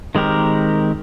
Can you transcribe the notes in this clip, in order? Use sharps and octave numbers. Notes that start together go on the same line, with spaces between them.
D#3 G#3 C4 G4 A#4